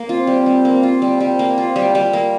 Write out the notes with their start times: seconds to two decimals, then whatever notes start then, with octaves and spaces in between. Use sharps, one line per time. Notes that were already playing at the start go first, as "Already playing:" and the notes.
Already playing: A#3
0.09 C4 F4
0.27 G3
0.46 G3
0.65 A#3
0.83 F4
1.02 G3
1.20 G3
1.39 A#3
1.58 F4
1.76 G3
1.95 G3
2.13 A#3